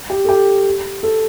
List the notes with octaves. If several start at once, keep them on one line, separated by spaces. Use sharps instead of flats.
G4
A4
G4
A4